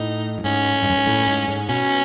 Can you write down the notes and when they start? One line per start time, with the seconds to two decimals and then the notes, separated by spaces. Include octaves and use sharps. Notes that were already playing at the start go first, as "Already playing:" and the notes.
Already playing: A2 D#4
0.38 F#2
0.44 G#2 C#4
0.75 A2
0.83 G#2
0.90 F#2
0.96 G#2
1.07 A2
1.27 G#2
1.48 G#2
1.69 B2 C#4